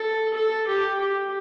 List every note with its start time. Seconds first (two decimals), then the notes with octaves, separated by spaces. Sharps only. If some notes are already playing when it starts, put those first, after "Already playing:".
Already playing: A4
0.34 A4
0.67 G4
1.00 G4